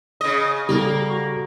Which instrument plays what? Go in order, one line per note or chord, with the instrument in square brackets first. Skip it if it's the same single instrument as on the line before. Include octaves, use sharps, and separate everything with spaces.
[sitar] C#3 D#5
[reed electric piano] C#3 A4 [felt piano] G3 [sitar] A#3
[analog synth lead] F#4